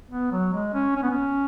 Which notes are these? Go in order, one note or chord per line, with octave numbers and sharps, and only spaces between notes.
B3
F#3
G#3
C#4
C#4
B3
C#4